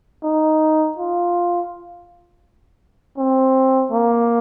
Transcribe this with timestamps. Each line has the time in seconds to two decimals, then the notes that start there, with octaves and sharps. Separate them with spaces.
0.23 D#4
0.97 F4
3.18 C4
3.92 A#3